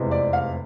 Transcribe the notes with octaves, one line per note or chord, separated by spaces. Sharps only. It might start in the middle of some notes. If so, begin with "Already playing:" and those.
Already playing: F1 E2 C3 E3 G#3
D5
F5